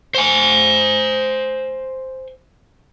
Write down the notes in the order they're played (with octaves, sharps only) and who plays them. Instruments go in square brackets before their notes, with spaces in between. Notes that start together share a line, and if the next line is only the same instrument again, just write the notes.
[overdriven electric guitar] C5 G#5